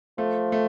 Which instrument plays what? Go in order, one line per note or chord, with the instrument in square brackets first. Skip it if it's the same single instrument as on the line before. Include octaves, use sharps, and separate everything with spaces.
[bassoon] F3 [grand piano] A3
[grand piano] A3